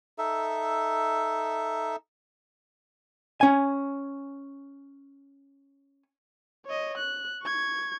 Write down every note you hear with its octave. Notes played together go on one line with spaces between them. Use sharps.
D#4 A4 E5
C#4 G#5
C#5 D#5
F#6
C#6 G#6